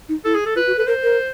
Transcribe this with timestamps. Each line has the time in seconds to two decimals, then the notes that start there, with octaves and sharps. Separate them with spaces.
0.09 D#4
0.24 E4 A4
0.35 G#4
0.46 A4
0.55 F4 B4
0.67 F#4
0.77 A4 B4
0.87 A#4 C5
1.03 A#4